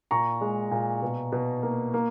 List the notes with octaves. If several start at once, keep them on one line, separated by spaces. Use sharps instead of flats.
A#2 A#5 C#6
G#3
A#2
B2
B2
A#3
A#3